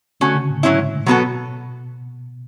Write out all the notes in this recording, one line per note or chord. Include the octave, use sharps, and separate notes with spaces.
D3 A3 C#4 F#4
C#3
A2
G#2 F#3 C#4 E4
G#2
A2
B2 F#3 B3 F#4 A4